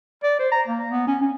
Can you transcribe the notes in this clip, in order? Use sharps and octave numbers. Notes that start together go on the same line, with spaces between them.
D5
C5
A#5
A#3
B3
C#4
C#4